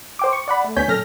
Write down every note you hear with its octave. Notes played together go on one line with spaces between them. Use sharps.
C5 G5 D6
C#6
D5 F#5 B5
A3
D2 B3 C#5 G#5 G6 B6
F#2 A#2 A4 F6 A#6